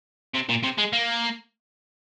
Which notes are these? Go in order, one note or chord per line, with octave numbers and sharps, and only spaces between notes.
C3
A#2
C3
G#3
A#3